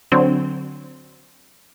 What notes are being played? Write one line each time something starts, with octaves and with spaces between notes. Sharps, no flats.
D3 F#3 C4